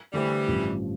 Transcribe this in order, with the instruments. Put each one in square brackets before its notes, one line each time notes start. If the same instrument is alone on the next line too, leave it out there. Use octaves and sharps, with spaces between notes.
[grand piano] D3 A3 D4 G4 C5 [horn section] E3 G3
[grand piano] A1 G2 F3